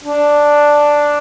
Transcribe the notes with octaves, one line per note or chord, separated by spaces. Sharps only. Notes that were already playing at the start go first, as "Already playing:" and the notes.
D4